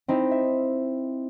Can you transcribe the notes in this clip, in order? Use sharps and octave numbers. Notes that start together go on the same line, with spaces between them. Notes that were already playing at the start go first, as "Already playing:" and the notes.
C4 D#4 E4
E5